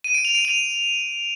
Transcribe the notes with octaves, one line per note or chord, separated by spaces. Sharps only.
D#7
D7
F7
D7
F7